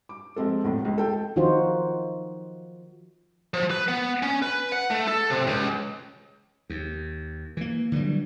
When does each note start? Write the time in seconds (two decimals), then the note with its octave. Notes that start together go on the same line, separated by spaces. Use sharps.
0.09 D6
0.36 F3 G#3 C4 A4
0.64 E2 A2 C3
0.85 C#2
0.98 A4 G5
1.36 D#3 F3 D#4 F4 F#4 C5
3.54 F3
3.71 B4
3.88 B3
4.22 C#4
4.42 B4
4.72 F#5
4.90 A3
5.08 A4
5.30 C3
5.47 C#2
6.70 D#2
7.57 E3 A#3
7.92 D3 E3 F#3 G3